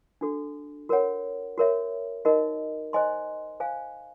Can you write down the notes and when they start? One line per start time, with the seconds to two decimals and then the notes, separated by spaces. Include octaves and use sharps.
0.21 D4 F#4 A4
0.89 F#4 A#4 C#5 F#5
1.58 F#4 A#4 C#5 E5
2.25 D#4 F#4 A#4 D#5
2.93 C5 D#5 G#5 C6
3.60 C5 F5 G#5